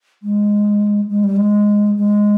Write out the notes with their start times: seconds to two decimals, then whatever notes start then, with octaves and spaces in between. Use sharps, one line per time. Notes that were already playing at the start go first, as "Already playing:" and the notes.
0.23 G#3
1.10 G#3
1.24 G3
1.36 G#3
1.96 G#3